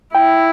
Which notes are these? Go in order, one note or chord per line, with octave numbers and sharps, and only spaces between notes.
E4 G5